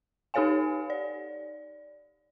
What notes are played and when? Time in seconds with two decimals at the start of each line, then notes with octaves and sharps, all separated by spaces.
0.34 D#4 G4 A4 C#5 F5 G#5
0.90 D5